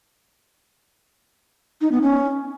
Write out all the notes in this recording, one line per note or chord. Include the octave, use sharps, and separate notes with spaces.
D#4
B3
C#4